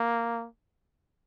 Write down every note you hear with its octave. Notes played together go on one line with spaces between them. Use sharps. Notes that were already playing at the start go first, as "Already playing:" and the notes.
Already playing: A#3